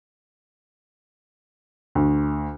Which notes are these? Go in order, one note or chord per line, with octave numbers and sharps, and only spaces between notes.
D2